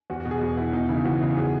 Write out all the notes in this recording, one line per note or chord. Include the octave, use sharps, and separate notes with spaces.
E2 F#4
F#4
B2
G#4
E2 F#4
B2 E4
E2 D#4
C#3 E3 E4
E2 F#4
C#3 E3 E4
G#4